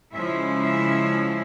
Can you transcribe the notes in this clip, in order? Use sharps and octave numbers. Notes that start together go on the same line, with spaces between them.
C#3 F3 G#3 C#4 E4 E5
E5